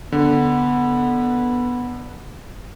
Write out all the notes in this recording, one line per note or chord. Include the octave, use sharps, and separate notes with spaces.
D3 B3